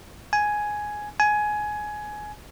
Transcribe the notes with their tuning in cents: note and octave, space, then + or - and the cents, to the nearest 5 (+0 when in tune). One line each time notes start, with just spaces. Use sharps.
G#5 +5
G#5 +15